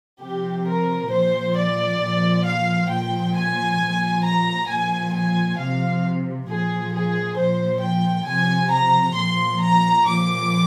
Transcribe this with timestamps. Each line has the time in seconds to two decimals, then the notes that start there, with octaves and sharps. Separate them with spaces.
0.21 C3 F3 G4
0.66 A#4
1.11 A#2 F3 C5
1.55 D5
2.01 A#2 F3
2.45 F5
2.89 A#2 F3 G5
3.34 G#5
3.79 A#2 F3
4.24 A#5
4.68 A#2 F3 G#5
5.14 G#5
5.57 C3 F3 F5
6.47 A#2 F3 G#4
6.92 G#4
7.36 A#2 F3 C5
7.82 G5
8.26 C3 F3 G#5
8.71 A#5
9.16 A#2 F3 C6
9.60 A#5
10.05 A#2 F3 D6